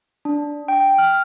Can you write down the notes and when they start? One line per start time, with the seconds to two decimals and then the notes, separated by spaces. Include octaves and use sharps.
0.25 D4
0.68 G5
0.98 F6